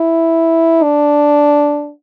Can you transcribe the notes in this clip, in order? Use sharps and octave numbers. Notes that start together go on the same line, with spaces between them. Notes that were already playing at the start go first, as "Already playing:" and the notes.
Already playing: E4
D4